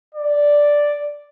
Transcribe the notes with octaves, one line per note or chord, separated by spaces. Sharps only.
D5